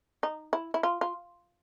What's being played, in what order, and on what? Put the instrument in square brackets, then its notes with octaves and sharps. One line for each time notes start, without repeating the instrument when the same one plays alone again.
[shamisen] D#4
E4
E4
F4
F4